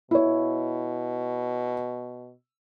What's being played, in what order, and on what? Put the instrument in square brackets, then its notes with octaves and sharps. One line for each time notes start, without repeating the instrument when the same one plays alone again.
[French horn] B2 [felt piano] E4 C#5